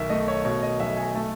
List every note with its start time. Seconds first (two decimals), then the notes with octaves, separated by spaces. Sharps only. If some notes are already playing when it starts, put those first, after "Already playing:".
Already playing: B1 D#3 E5
0.10 A3 D#5
0.28 C#5
0.45 B2 C#5
0.62 D#5
0.80 B1 E5
0.97 G#5
1.15 A3 A5